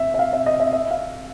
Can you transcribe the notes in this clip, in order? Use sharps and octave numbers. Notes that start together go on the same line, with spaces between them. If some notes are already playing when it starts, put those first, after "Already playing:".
Already playing: E5
E5
F5
E5
D#5
E5
E5
F5